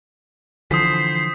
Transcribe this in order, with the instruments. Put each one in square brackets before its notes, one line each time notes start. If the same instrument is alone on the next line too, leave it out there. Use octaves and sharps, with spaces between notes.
[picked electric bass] D3 E3 F3 [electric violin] C5 C7 [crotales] D#6 B6